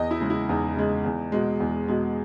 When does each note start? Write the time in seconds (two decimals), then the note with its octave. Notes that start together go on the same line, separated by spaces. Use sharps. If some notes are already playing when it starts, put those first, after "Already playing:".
Already playing: E2 D#5
0.11 E4
0.20 C#3 G#3
0.30 E4
0.49 E2 D#4
0.76 C#3 G#3
1.05 E2
1.32 B2 G#3
1.60 E2
1.88 B2 G#3